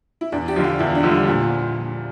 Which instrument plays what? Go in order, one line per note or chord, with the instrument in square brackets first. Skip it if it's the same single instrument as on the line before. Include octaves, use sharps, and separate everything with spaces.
[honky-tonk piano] E4
[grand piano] E2 [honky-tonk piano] D4
[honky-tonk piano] G4
[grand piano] D3 F3
[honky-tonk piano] F4
[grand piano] E2 [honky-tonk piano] E4
[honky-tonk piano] D4
[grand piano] D3 F3
[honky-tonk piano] G3
[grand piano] A#2 [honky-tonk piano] F3